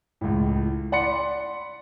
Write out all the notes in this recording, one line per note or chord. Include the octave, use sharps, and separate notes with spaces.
C#2 A2
D5 F#5 B5 C6 C#7